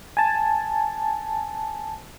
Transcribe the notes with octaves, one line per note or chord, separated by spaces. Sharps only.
G#5 A5